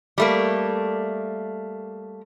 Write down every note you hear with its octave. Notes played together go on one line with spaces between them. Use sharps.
G3 A3 A#3